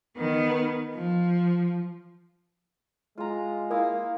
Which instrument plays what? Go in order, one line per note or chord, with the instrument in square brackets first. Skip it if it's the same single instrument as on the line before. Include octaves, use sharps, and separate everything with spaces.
[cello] D#3 B3
F3
[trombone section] G#3 [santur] F4 A#5
[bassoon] A#3 [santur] E4 F5 D#6